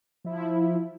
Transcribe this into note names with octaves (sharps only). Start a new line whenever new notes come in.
F3 E4